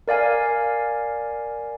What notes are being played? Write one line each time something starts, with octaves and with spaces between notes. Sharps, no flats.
A#4 D5 F5 G#5